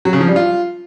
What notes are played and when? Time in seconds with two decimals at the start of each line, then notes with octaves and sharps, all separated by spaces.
0.05 F#3
0.13 C#3
0.21 F3
0.28 G3
0.36 F4